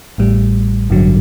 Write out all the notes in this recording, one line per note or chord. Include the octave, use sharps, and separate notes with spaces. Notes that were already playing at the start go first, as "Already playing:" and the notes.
A1 A2 G3
A1 G2 D3 F#3